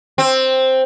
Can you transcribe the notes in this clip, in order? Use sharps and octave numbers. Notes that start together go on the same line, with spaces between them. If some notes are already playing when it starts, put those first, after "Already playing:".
C4